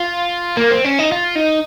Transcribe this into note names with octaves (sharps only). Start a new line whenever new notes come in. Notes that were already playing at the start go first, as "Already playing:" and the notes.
Already playing: F4
A#3
C4
C#4
D#4
F4
D#4